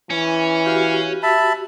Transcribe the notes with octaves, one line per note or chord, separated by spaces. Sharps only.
E3 C#4
F#4 G4 F5
E5 A5 B5